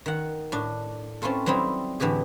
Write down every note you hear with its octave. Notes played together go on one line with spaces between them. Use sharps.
D#3 F#5
A2 D4
C4 C#4 E4 F4 A4
F#3 G3 C4 D#4 E4
A2 D3 E3 G4 G#4